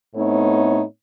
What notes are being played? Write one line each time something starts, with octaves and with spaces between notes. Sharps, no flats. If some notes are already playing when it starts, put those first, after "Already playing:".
A2 A3 B3 C4 D#4 C#5